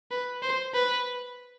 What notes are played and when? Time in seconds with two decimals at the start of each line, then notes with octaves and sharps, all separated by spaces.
0.11 B4
0.42 C5
0.75 B4